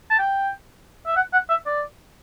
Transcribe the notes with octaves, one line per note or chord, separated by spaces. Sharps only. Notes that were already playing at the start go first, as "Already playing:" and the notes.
A5
G5
E5
F#5
F#5
E5
D5